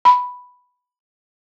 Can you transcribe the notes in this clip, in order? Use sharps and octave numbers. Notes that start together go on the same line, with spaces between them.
B5